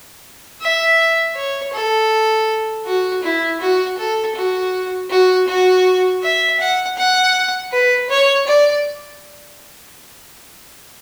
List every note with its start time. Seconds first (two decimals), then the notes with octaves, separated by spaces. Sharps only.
0.61 E5
1.36 C#5
1.73 A4
2.86 F#4
3.23 E4
3.61 F#4
3.98 A4
4.36 F#4
5.10 F#4
5.48 F#4
6.23 E5
6.60 F#5
6.98 F#5
7.72 B4
8.10 C#5
8.47 D5